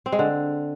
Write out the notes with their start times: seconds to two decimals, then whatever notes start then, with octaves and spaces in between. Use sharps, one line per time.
0.06 C4
0.12 G#3
0.19 D3